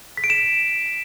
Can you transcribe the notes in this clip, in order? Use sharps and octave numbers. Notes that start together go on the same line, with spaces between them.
B6
D7
E7